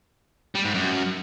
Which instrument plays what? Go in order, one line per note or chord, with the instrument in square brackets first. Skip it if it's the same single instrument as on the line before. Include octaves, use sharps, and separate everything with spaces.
[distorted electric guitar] G3
G#2
F#2